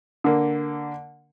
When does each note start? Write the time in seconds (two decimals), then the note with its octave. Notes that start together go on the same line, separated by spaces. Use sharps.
0.24 D3 A#3